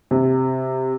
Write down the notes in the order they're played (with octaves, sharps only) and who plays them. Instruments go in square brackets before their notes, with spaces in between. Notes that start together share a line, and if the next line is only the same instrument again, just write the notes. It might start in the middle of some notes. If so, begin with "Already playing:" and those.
[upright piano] C3